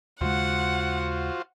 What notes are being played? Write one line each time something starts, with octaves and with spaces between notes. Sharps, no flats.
D#2 C#3 G#3 F4 F#4 C5 F#5